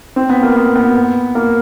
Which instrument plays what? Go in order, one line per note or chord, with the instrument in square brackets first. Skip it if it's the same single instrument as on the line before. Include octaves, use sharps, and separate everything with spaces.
[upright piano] C4
B3
A#3
B3
B3
A#3